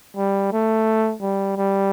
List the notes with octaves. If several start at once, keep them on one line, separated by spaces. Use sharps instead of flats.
G3
A3
G3
G3